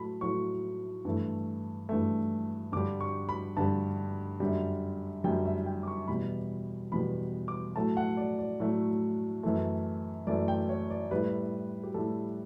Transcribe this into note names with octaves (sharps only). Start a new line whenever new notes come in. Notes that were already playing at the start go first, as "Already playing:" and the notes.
Already playing: A2 F#3 A3 B5
A2 F#3 A3 C#6
G2 E3 A3
G2 E3 A3
G2 D3 G3 D6
C#6
B5
G2 D3 G3 A5
F#2 D3 G3
F#2 D3 G3 G5
E5
G5
D6
C#6
E2 B2 G3 B5
E2 B2 G3 B5
D6
A2 F#3 A3 A5
F#5
D5
D5
A2 F#3 A3
F#2 E3 A3
F#2 E3 A3 D5
G5
C#5
D5
A2 G3 B4
G4
A2 G3 A4